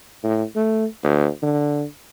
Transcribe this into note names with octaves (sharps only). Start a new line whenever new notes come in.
A2
A3
D2
D3